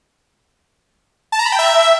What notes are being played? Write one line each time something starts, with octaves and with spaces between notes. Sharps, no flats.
A5
A#5
B5
G5
E5